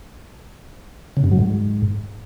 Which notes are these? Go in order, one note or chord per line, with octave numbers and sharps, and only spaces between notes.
C#3
G2
F#3
G#2